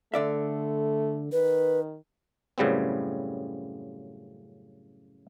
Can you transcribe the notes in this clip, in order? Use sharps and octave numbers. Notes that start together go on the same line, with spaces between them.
D3 A3 D5 E5
D#3 B4
F#2 A2 C#3 G3 B3 C4